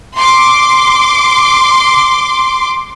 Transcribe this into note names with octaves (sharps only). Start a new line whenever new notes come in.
C6 D6